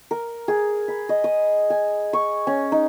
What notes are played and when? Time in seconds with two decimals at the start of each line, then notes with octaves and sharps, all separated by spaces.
0.11 A#4
0.48 G#4
0.88 B5
1.09 D#5
1.24 D#6
1.70 G#5
2.13 C#6
2.47 C#4
2.72 D#4